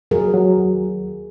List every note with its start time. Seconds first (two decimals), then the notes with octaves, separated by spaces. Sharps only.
0.11 F#3 G#4 A#4
0.34 F#3
0.57 D#2